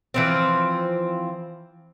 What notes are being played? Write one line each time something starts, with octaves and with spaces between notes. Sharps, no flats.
E3 F3 C4